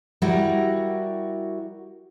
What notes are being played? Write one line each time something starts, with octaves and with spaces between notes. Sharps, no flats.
G3 E4 F#4 A#4